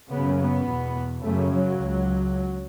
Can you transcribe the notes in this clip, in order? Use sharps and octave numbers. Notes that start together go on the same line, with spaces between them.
F#2 C#3 B3
B3
E2 B2
F#2 C#3 A3
F#3
C#2